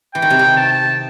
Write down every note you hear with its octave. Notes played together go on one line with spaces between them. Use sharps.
E3 G5
D#3
C3
D#3
A5